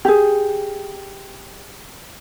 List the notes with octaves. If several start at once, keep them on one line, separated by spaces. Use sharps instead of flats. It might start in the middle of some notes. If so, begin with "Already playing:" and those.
G4 G#4